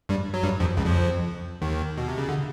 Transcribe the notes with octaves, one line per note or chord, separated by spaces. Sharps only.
G2 G3
F#3
G2 G3
F2 F3
C#2 C#3
F2 F3
D#2 D#3
B2
C3
C#3
D3